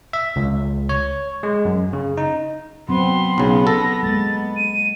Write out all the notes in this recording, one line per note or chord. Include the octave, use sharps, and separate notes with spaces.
E5
C#2
C#5
G#3
F#2
C#3
D#4
F#3 B3 C4 C6
B1 C#3
A4 A#6
G#3 A#3 A6
D#7